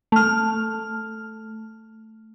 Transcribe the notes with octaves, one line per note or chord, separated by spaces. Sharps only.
A3 F6